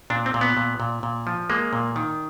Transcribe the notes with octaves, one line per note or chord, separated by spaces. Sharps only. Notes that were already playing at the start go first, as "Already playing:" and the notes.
A#2 D4
C4
A#2
B3
A#2
A#2
A#2
F3
G#3 A#3
A#2
D#3